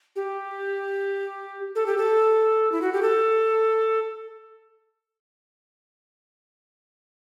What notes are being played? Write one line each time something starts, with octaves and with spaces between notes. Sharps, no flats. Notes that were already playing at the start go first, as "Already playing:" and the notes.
G4
A4
G4
A4
E4
F#4
G4
A4